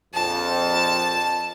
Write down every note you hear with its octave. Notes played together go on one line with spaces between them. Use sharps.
A#1 F2 A5